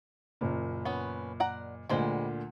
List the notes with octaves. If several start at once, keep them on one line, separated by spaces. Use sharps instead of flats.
F#1 A#2
B3 C#4
D5 F#5 A#5
D2 A#2 D3 G3 G#3 C5